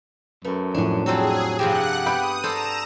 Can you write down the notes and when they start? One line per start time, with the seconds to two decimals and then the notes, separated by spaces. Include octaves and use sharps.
0.45 F#2 A3 B4
0.75 F2 A2 C#4 D4
1.06 F#3 G3 C4 G#4 A4
1.59 G2 C3 F3 G4 F#5 F#6
2.06 B3 B5 D#6 G6 D7
2.44 A4 C5 D5 A#5 E7